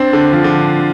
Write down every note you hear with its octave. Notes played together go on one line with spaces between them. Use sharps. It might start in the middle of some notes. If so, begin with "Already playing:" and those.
Already playing: C4 D4
D3
F3
D3